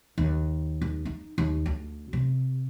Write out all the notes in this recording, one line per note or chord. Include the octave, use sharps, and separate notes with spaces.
D#2
D#2
D#4
D#2
D2
C3